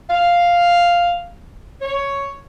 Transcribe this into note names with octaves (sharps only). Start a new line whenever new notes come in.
F5
C#5